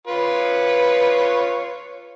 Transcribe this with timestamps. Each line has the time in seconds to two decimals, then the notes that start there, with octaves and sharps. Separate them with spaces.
0.07 F4 B4 C#5